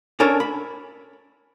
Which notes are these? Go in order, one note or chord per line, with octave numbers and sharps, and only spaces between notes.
C#4 D4 A4 A#4 C#5
B5